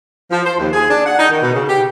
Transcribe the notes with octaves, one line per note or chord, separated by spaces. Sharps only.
F3
C5
D#2
G#4
D4
F#5
D#4
D#3
B2
C#3
G4